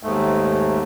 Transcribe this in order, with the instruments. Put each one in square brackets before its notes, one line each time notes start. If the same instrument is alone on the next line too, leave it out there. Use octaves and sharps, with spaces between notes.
[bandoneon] D#2 G#2 A3